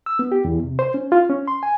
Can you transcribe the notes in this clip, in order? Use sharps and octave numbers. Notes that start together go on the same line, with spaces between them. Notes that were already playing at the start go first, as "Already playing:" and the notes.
E6
B3
G4
E2
C3
C5
C#4
F4
C#4
C6
G#5